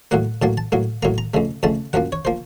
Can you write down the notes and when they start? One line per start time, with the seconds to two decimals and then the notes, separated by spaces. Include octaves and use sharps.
0.11 A2 F#3 A#3 F#5
0.42 A2 F#3 A#3 A5
0.58 A5
0.72 A2 F#3 A#3
1.03 A2 F#3 A#3 A#5
1.18 A#5
1.34 F2 C#3 A3
1.63 F2 C#3 A3 A5
1.93 F#2 F3 A#3 F#5
2.12 C#5
2.25 F3 A#3 C5